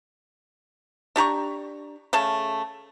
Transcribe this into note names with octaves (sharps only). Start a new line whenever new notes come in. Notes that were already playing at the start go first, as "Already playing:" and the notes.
D4 G4 A#5 C#6
C#3 A3 A5